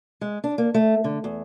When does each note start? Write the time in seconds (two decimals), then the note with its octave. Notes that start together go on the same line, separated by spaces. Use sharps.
0.21 G#3
0.44 D4
0.58 A#3
0.74 A3
1.04 D3
1.24 E2